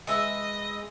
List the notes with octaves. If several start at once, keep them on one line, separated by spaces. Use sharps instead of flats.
G#3 B4 D#5 E5